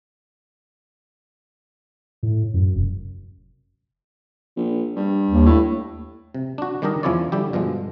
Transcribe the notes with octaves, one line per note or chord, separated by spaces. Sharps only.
A2
F#2
F1
A#1
G2
D#2
A2
C3
D4 F#4
D#3 G3 D4 G4 A#4 D#5
E2 F3 C#4 E4 C#5 D5
D3 G3 E4 G4
G2 B2 D3 F3 G#3